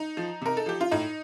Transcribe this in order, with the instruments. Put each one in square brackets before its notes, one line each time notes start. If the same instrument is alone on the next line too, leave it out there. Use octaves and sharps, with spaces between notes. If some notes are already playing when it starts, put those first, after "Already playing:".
Already playing: [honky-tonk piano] D#4
F3
C3 A#4
A4
F3 G4
F4
A2 D#4